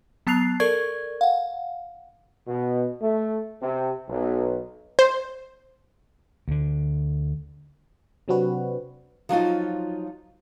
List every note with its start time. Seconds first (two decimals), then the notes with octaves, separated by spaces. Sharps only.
0.27 F#3 B3 A5 F#6 C7 F7
0.60 A4 A#4 D5 C#6 G#6
1.21 F5 F#5
2.47 B2
3.01 A3
3.61 C3
4.09 B1
4.99 C5
6.48 D2 D3
8.28 C3 F#3 C4 D4 F#4 B4
9.29 F3 F#3 D#4 F4